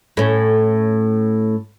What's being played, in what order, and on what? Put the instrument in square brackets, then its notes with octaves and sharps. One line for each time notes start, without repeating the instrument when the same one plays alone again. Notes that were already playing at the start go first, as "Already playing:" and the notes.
[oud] A2 C#4